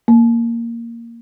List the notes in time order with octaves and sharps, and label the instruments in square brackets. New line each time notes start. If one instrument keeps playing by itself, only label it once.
[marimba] A#3